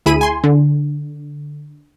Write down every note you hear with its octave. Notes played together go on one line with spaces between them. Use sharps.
D2 E4 G#4 B5 D#7
G#5 C6
D3